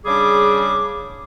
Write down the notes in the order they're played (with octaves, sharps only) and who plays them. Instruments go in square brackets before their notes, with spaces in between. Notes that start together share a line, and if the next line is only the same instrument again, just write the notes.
[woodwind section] C#3 G3 D4 G#4 D6